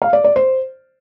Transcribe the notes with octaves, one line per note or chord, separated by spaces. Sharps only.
F5
D5
D5
C5